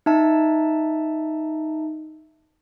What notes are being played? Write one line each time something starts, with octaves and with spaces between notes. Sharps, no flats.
D#4 E5 A5